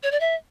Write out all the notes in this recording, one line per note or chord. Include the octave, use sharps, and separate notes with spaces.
C#5
D5
E5